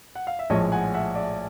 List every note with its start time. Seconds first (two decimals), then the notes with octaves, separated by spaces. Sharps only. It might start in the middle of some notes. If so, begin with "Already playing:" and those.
0.15 F#5
0.27 F5
0.39 E5
0.50 A#1 A2 F3 G#3 C#5 D#5
0.72 F#5 G#5
0.94 E5 F#5
1.15 D5 E5